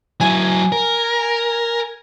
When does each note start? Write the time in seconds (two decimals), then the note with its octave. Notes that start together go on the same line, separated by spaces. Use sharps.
0.21 F#3 E4 G#5
0.72 A#4